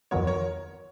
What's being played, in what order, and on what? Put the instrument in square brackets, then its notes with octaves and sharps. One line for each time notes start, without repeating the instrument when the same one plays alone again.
[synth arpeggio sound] F2 D#3 F#3 B3 [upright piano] A#4 C#5
[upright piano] A#4 C#5